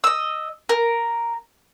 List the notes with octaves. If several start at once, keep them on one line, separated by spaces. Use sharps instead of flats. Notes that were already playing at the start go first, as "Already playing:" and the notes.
D#5 E6
A#4